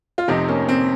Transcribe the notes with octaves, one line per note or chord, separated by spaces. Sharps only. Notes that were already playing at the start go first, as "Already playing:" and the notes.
F4
F1 F2 C3 C4 D#4
A#3 C#4
C4